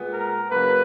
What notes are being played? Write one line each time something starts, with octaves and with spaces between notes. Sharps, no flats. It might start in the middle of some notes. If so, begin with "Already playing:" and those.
Already playing: A#2 G#3 B3
A#4
C#3 F#3 A#3 B4